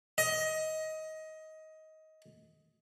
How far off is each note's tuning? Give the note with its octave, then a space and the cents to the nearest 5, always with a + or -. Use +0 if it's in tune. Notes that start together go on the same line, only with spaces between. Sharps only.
D#5 +20